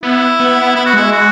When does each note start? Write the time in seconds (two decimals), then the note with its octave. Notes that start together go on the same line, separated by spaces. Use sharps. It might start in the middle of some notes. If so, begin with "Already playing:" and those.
0.03 B3 E4
0.40 B3
0.75 B3 E4
0.86 F#4
0.94 G#3 E4
1.12 F#4